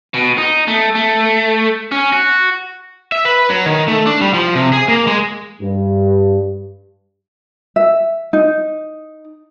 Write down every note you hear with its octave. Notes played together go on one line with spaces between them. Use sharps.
B2
D#4
A3
A3
C#4
F#4
E5
B4
F#3
D#3
A3
D4
G3
F3
C3
G#4
A#3
G#3
G2
E5
D#4